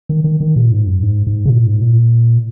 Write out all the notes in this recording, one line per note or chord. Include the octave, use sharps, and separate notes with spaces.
D#3
D#3
D#3
A#2
G#2
F#2
G#2
G#2
C#3
A#2
G#2
A#2